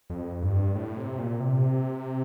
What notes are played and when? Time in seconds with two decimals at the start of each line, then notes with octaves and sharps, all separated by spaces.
0.10 F2
0.42 G2
0.75 A2
0.97 C3
1.18 A#2
1.40 C3